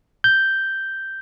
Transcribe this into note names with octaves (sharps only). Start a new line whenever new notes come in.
G6